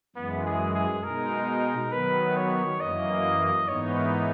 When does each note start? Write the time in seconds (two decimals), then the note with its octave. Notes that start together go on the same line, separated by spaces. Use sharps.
0.16 F#2 E3 G#3 B3
0.45 G#4
0.74 G#4
1.04 B2 G#3 D#4 A#4
1.92 D#3 F#3 B3 B4
2.36 C#5
2.80 F#2 E3 A#3 D#5
3.68 G#2 E3 B3 D#4 C#5
3.97 A#4